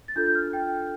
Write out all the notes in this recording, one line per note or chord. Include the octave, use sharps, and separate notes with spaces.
A6
D4 F4 A4 G6
G6
F6
G5